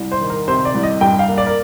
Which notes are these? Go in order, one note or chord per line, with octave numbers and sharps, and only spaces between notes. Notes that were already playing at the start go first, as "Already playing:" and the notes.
Already playing: C2
C5
D#3
A#4
C3 C5
D5
C2
D#5
G2 G5
F5
A#3
D5
A#4